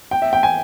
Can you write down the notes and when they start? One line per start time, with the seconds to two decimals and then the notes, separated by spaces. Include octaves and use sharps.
0.11 G5
0.22 E5
0.33 G5
0.43 G#5